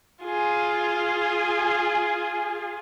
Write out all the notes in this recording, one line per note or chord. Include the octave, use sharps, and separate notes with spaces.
F4 G#4